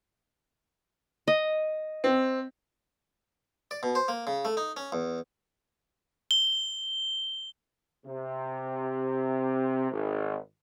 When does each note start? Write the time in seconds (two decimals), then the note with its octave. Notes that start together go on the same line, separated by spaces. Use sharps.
1.28 D#5
2.04 C4
3.71 D5
3.83 B2
3.95 C5
4.08 A#3
4.27 C#3
4.45 A3
4.57 D#4
4.77 C#4
4.92 E2
6.31 G7
8.06 C3
9.92 G#1